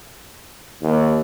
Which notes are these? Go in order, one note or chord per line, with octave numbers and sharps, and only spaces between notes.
D#2